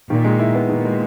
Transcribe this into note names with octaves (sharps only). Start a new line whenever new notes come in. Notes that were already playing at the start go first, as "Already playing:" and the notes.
A#2 D#3
G#3
E4
B3
A#2 D#3
G#3